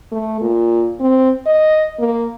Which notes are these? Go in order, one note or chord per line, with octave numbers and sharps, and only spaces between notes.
A3
A#2
C4
D#5
A#3